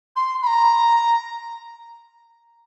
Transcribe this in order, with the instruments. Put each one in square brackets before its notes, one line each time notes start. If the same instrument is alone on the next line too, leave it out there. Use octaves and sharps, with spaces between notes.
[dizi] C6
B5
A#5